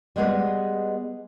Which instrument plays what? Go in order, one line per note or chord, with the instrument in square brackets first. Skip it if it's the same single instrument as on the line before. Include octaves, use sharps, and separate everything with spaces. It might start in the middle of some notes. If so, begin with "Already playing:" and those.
[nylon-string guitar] G3 G#3 B3 G#4 B4 D#5